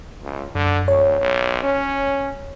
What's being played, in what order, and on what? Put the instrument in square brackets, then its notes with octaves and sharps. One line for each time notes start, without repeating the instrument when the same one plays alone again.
[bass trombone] C#2
[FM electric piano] F#2 [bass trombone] D3
[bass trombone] D2 [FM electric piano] C#5
[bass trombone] B1
C#4